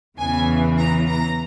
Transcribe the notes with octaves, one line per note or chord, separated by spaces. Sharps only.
E2 C#3 E3 G#5
A#5
A#5